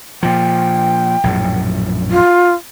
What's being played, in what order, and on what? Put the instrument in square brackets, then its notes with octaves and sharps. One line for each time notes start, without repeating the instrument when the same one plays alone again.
[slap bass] A#2 F3 [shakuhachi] G5
[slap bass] A#1 F#2 A2
[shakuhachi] F4